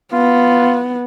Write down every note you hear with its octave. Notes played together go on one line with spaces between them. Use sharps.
B3 F4